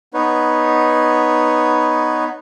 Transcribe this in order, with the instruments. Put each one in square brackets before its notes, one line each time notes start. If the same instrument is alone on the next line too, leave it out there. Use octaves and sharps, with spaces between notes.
[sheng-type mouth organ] B3 D#4 B4 C#5